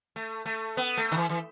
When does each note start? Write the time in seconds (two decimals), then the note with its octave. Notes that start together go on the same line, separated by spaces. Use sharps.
0.16 A3
0.46 A3
0.77 B3
0.97 A3
1.12 D#3
1.17 E3
1.29 E3